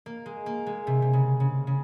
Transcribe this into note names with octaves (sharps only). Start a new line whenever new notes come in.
A#3
G#3
A#3
G#3
C3
C3
C#3
C#3
C#3